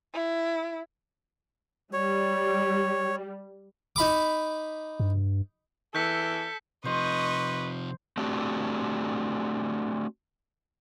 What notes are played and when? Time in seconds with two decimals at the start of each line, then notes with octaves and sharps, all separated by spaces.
0.14 E4
1.93 G3 C#5
3.96 D#4 B5 D6
5.00 G2
5.95 E3 A4 G6 B6 C#7
6.85 C3 F3 B4 C5 D#5 C#6
8.17 A3 C4 D4 F#4 G4